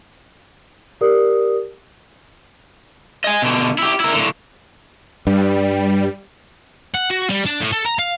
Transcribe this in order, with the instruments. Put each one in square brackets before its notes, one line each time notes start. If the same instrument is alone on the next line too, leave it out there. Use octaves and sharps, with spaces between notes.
[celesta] G4 A#4 D5 D#6
[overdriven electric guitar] D#5 G#5
B2 D3
E4 G4
E4 A#4
A2 D3
[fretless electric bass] G2 [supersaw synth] G3
[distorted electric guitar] F#5
F#4
G3
D4
A2
A4
A#5
F5